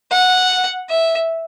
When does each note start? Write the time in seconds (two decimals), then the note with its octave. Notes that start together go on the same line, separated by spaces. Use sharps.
0.11 F#5
0.89 E5